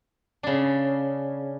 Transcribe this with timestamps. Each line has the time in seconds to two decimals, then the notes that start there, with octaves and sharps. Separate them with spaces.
0.43 C#3 D4